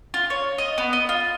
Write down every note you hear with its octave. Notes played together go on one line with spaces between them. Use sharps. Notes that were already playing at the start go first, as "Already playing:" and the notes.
F4
C#5
D#5
B3
D#5
F4